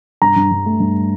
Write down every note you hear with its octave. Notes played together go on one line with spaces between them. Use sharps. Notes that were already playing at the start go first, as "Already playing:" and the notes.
G2 A#5
G2
G2
A3
G2